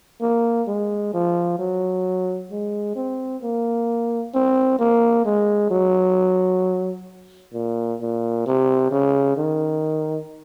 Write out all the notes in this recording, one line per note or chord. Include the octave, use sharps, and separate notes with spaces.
A#3
G#3
F3
F#3
G#3
C4
A#3
C4
A#3
G#3
F#3
A#2
A#2
C3
C#3
D#3